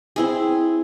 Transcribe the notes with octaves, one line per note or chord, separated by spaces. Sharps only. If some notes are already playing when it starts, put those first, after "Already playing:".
C4 E4 G#4